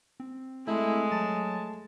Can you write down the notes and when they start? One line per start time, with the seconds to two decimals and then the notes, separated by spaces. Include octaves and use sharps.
0.20 C4
0.67 G#3 A3 E4
1.11 F#3 A5